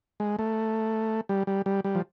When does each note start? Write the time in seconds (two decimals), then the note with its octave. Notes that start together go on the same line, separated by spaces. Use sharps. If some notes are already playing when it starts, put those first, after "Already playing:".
0.20 G#3
0.39 A3
1.29 G3
1.47 G3
1.66 G3
1.84 G3
1.95 F3